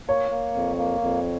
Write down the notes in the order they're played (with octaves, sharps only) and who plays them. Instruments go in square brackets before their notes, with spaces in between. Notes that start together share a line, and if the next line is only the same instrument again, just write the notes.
[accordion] A#3 [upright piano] C#5
[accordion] A#3
F2
A#3
F2